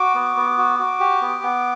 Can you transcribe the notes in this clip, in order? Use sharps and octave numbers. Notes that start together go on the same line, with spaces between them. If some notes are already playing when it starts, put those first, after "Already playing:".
Already playing: F#4 D6
B3
B3
F#4
F#4
G4
B3
B3